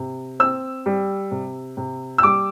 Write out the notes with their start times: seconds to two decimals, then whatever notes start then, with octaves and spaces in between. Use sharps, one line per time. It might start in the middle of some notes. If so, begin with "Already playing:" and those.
Already playing: C3
0.40 C4 E6
0.86 G3
1.31 C3
1.77 C3
2.18 E6
2.23 G3 D6